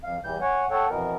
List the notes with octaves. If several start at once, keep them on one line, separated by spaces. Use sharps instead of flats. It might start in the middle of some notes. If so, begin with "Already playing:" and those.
F2 F5
E2 E3 G3 G6
C#5 F#5 G#5
A4 C#5 F#5 G5
F2 B2 E3 B3 A#4